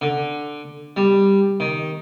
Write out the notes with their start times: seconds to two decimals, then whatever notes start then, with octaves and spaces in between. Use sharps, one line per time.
0.01 D3
0.96 G3
1.60 D#3